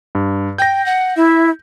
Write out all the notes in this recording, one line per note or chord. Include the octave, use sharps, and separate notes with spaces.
G2
G5 G6 A#6
F#5
E4 E5